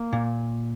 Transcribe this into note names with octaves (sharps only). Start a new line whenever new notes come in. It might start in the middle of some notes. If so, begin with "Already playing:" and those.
Already playing: A#3
A#2